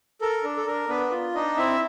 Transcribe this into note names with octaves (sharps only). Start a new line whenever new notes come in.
A4 A#4
D4
A4
D4 A#4
B3 D4 B4
F4
D4 D#4 D#5
C4 E4 E5